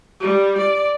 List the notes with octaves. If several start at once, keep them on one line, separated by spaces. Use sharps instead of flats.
G3
D5